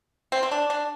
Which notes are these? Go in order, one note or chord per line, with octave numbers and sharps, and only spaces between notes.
C4
C4
D4
D4